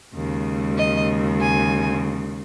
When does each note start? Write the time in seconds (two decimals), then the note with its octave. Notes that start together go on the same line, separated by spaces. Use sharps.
0.12 D#2 C#3 G#3
0.77 D#5
1.41 G#5